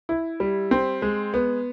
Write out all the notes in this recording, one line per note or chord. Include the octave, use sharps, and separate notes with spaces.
E4
G3
C4
G#3
B3